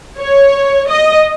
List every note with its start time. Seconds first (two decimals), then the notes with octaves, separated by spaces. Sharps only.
0.19 C#5
0.88 D#5